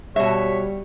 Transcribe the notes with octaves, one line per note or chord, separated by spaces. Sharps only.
B2 G3 C#5 E5